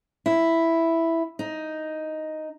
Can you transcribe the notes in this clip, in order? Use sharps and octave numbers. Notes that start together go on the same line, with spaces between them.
E4
D#4